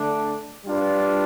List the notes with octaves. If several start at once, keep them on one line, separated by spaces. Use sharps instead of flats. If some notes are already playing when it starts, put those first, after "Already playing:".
Already playing: D3 A3 D4 A4
G3 D4 F4 B4